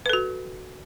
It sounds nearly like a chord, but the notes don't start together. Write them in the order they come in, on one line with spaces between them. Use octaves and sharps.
B4 A4 F#4